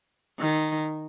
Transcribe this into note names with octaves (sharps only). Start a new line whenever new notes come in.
D#3